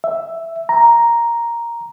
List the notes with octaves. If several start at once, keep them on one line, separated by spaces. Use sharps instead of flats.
E5
A#5